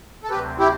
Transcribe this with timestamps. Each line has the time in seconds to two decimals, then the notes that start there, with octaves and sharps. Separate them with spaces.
0.23 A4
0.30 D2 C3 F#3 C4 G4 B4
0.59 E4 G4